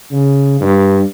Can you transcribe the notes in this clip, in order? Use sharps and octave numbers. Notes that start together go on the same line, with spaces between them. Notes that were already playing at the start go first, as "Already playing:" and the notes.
C#3
G2